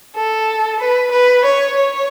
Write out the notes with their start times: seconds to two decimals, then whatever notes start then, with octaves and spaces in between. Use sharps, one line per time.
0.15 A4
0.80 B4
1.12 B4
1.45 C#5
1.76 C#5